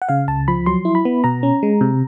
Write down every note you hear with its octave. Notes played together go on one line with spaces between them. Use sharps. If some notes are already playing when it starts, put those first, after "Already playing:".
F#5
C#3 F5
C#2 A5
F3 B5
F#3 C6
E4
B5
B3
B2 A#5
C#4
G#3
C3